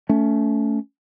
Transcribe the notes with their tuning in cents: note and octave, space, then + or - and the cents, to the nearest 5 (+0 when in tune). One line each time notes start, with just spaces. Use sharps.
A3 +0 C#4 +20